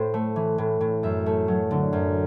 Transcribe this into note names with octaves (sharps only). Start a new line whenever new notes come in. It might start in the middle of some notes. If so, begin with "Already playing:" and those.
Already playing: A2 C5
A3
E3
A2
A2
F#2 E5
A3
F#3
D3
F#2